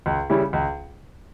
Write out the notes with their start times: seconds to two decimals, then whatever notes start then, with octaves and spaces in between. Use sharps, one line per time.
0.06 C#2
0.30 C#3 G3 C#4 E4
0.53 C#2